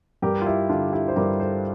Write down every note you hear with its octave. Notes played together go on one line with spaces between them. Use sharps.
G2 G4 A#4
F4
E4 G4
D3 D4 F4
E4 G4
C5
G2 G4 A#4
A4 C5